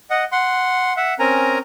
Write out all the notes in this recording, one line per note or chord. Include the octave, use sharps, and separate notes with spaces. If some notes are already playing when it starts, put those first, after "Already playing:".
D#5 F#5
F#5 C6
E5 F#5
C4 C#4 A#4 G#5 A#5